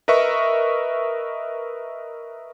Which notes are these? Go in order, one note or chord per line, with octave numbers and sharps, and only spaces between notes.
A#4 B4 D#5 E5 C#6